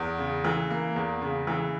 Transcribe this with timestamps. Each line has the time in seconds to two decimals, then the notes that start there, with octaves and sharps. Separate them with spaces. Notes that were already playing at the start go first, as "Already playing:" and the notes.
Already playing: E2
0.18 C#3
0.45 E3
0.70 A#3
0.96 E2
1.22 C#3
1.47 E3